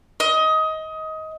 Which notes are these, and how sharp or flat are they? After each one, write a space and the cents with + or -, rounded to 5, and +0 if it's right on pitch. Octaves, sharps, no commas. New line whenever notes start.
D#5 +20